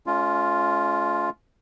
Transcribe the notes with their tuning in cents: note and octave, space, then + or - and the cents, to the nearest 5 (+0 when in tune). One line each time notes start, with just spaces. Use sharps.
A3 -45 C#4 +30 F4 +0